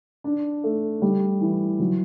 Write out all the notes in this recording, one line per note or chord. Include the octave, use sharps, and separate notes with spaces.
D4
A3
G3
E3
F#3